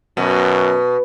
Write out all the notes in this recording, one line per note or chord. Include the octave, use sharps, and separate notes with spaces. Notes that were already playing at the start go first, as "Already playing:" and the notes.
F#2 B2